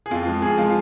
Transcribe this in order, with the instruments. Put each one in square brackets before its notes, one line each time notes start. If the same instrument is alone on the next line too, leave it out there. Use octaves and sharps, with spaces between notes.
[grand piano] G#4
F2 F4
F3 G#3
F2 G#4
F3 G#3 F4